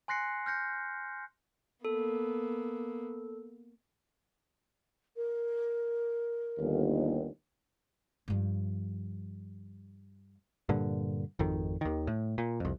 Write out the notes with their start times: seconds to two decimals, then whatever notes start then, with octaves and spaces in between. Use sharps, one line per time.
0.08 G#5 C6 F#6 A#6 C7 C#7
0.46 F6 G6 A#6 C#7
1.85 A#3 B3 A4
5.16 A#4
6.59 G1 D#2
8.28 G2 F3
10.69 G2 A#2 D3
11.39 G#1 F2 D#3
11.81 D#2 D#3
12.07 A2
12.38 A#2
12.60 C2 F2